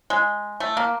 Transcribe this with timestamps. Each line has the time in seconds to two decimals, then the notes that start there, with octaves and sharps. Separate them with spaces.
0.10 G#3
0.60 A3
0.77 A#3